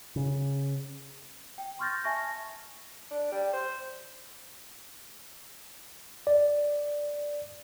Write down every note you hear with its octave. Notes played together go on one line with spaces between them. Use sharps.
C#3
G5
C6 C#6 F6 G6 A6 A#6
E5 G#5 A5 C#6 G#6 A#6
D4
G3
C5
D5